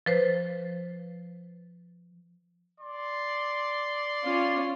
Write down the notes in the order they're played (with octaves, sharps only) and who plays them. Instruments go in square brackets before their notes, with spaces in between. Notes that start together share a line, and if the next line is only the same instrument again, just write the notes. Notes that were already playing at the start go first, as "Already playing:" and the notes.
[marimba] F3 B4 C5
[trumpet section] D5 C6
[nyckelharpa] C#4 F4